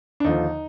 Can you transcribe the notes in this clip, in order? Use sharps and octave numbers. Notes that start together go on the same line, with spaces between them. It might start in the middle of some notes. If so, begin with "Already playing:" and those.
D4
D#2 D3 F3 D#4